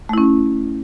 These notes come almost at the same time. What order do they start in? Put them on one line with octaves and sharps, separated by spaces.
A3 E4 C#4